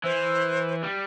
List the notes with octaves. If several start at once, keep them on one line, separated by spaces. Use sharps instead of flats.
E3 C5
G3